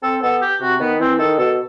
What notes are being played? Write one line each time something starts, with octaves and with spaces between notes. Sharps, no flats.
C4 A4
B3 A4
G4
C3 F#4
D#3 B3
E3 C4
D#3 A4
B2 A4